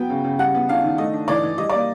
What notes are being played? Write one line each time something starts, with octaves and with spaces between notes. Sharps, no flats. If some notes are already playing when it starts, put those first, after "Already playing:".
Already playing: F#3 B3 G5
C#3
C#3
G3 F#5
B3
D4 F5
D#3
A3 D#5
D4
E3 D5
E3
G3 D#5
A#3 D5